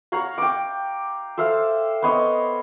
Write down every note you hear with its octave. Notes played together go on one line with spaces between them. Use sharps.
C#5 F5 F#5 A#5
G5 D6
A4 C5 E5 F5
B3 C5 C#5 D#5